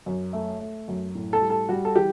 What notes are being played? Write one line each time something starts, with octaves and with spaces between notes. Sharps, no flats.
F#2
A3
A3
F#2
A2
A4
G3
A4
G3 F#4
A4
E3 G4